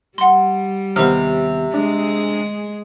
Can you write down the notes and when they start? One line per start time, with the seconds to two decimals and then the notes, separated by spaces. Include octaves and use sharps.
0.18 G3 F#5 C6
0.96 D#2 C3 D#3 B3 C5 F6
1.74 G#3 D4 G#4